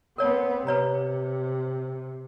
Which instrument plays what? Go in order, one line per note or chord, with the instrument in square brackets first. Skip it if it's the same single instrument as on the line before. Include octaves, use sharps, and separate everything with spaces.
[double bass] B3 C4 [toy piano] A#4 C#5 A5
[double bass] C3 [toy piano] B4 C#5 A#5